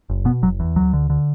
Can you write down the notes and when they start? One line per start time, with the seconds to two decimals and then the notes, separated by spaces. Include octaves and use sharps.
0.10 F#1
0.25 B2 B3
0.42 F#1 F#3
0.60 E2
0.76 D2 F#3
0.93 D3
1.10 D3